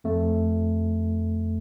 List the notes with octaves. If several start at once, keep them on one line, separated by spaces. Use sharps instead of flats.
F2 A3